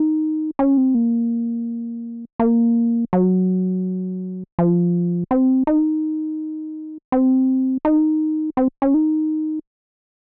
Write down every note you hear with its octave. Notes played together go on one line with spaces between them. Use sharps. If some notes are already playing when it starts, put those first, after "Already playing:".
Already playing: D#4
C#4
C4
A#3
A#3
F#3
F3
C4
D#4
C4
D#4
C4
C#4
D#4